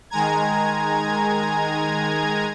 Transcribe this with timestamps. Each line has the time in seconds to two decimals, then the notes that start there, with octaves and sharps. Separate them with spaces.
0.10 D#3 G#3 G#5 A#5 G#6